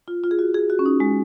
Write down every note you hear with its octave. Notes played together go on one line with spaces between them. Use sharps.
F4
F4
G#4
F#4
G#4
F#4
C#4
D#4
G#3